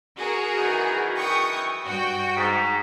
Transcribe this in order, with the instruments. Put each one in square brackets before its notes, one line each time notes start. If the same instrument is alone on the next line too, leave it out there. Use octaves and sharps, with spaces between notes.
[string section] F#4 G#4 A#4
[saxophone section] F#2 D#3 E3
[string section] G5 C#6 D#6
G2 F#4 G5
[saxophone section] G#2